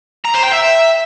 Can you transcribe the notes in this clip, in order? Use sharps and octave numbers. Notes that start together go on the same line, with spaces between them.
A#5
C5
G5
E5